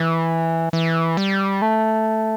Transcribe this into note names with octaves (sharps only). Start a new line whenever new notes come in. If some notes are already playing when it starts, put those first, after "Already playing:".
Already playing: E3
E3
G3
A3